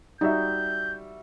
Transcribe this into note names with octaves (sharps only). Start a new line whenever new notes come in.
G3 D#4 F#4 E5 G6